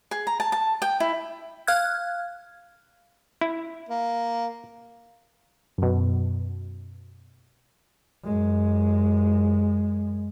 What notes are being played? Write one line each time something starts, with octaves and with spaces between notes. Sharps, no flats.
G#4
A#5
A5
A5
G5
E4
F5 F6 F#6 G#6
E4
A#3
F#2 B2
F#2 G#3